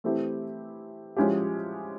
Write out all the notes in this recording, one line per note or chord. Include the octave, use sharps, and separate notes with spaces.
E3 A3 C4 E4 G4
F3 G#3 C#4 E4 G4